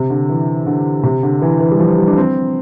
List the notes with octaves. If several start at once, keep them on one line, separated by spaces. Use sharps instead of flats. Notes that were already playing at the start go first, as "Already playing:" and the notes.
Already playing: C3
D3
E3
D3
C3
D3
E3
E3
G3
F3
G3
D4
C4